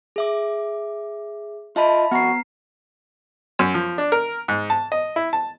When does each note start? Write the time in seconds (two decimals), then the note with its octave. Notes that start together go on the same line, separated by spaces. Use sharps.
0.16 G#4 E5 D6
1.76 F4 D#5 E5 A5 B5
2.11 F2 B3 F#4 A#5 C7
3.59 F#2
3.74 F3
3.98 D4
4.12 A#4
4.48 G#2
4.70 A5
4.92 D#5
5.16 E4
5.33 A5